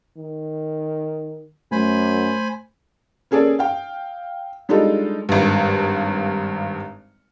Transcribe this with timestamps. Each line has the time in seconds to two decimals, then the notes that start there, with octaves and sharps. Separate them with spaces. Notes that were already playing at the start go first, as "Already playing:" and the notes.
0.17 D#3
1.72 F#2 A3 C5 G#5 B5
3.31 A#3 C#4 G#4 A4 D5
3.59 F5 G5
4.69 G3 G#3 D4 D#4 F4 A4
5.29 G#1 G2